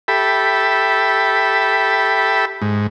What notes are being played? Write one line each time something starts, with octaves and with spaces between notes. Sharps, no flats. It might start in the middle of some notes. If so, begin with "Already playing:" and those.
G4 A4 E5 B5
G#2